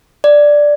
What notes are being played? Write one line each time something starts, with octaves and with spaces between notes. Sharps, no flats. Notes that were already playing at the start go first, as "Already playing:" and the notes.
D5